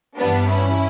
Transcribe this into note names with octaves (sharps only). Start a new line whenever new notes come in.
G2 E3 G3 B3 D4
C#4 E4